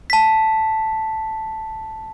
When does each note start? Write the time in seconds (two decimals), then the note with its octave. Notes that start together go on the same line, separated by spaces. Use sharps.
0.10 A5 B6